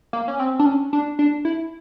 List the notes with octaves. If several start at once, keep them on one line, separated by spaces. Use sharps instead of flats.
A#3
C#4
C4
D4
C#4
D4
D4
E4